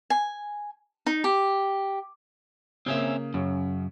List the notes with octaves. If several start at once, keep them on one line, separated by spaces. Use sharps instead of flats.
G#5
D#4
G4
C#3 A#3 C4 C#4 E5
F#2 C#3